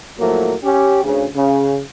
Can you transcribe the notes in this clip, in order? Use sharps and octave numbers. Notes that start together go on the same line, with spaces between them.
A2 F3 F#3 A3 A#3
C#4 G4
D2 C#3
C#3